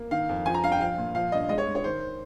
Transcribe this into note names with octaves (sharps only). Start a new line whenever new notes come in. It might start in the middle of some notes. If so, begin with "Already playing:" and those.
Already playing: A#3
D#3 F5
F2
F3 G#5
A#5
G2 F5
G5
F3 F5
A#2
F3 F5
G2 D#5
G#3 D#5
C#5
G#3
C#5
D#3 C5